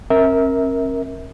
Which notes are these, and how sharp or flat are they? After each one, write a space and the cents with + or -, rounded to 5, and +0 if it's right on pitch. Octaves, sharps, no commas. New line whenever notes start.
C#4 -45 A#4 +0 E5 -25